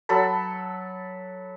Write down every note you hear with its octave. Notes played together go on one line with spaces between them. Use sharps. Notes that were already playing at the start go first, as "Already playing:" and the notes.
F#3 A4 A5 B5